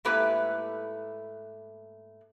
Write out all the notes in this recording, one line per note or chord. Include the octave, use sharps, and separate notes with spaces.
G#2 A3 A#3 E4 G4 B4